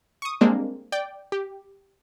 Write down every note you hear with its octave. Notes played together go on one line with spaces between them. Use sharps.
C#6 D#6
G3 G#3 A#3 C4 D4
D5 G5
G4